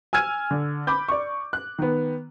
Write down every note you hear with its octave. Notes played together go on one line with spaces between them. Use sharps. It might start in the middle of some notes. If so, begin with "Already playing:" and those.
G#5 E6 F6 G#6 D#7
D3
B5 D6 G6
D5 C#6
F#6
D#3 B3